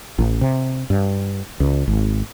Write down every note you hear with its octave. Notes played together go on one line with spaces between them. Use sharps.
A1
C3
G2
C#2
G#1